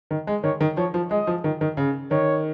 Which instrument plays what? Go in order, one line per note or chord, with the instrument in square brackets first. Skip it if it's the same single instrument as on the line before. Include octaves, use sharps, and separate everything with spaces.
[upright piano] D#3
G#3
[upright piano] D#3 [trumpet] C#5
[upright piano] D#3
[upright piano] F3 [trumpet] C#5
[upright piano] F3
[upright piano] G#3 [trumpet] D#5
[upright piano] F3
D#3
D#3
C#3
[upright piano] D#3 [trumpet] C#5